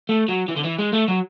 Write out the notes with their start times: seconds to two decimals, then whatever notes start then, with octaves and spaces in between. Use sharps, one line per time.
0.09 A3
0.29 F#3
0.49 E3
0.57 D3
0.64 E3
0.79 G#3
0.93 A3
1.08 F#3